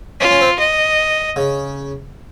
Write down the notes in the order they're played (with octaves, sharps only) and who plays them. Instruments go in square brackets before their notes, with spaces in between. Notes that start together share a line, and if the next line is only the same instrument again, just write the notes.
[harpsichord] C#4 [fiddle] F4
[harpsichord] C#4
C4
[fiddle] D#5
[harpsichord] C#3